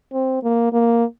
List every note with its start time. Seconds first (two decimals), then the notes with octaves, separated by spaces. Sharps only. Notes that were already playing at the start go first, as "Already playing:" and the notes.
0.13 C4
0.43 A#3
0.73 A#3